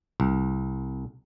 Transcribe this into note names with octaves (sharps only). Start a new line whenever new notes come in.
C2